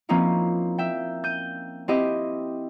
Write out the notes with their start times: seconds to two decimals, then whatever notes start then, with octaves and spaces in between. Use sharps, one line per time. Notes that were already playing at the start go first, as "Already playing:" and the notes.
0.09 F3 A#3 C4 C#4 D#4 E4
0.78 E5 G5
1.24 G6 D#7
1.88 C4 E4 G4 D#5 G5